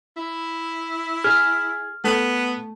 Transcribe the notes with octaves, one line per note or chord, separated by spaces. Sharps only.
E4
G#4 F6
A3 B3